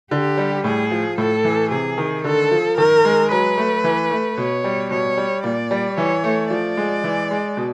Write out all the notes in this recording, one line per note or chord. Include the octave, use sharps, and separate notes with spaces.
D3 G4
G3
A2 G#4
F3
A2 A4
E3
C3 G#4
D#3
D3 A4
F3
D#3 A#4
G#3
F#3 B4
A3
E3
A3
B2 C#5
G3
B2 C#5
G3
A#2 D5
G3
E3 C#5
A3
F3 D5
G#3
E3
G#3
B2